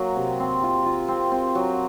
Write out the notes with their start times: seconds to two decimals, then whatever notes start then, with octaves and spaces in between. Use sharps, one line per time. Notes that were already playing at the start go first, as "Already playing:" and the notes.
Already playing: F#3 A#3
0.16 C3
0.40 C4
0.63 F4
0.86 F4
1.08 C4
1.32 C4
1.55 F#3